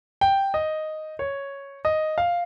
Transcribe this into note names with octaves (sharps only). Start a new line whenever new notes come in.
G5
D#5
C#5
D#5
F5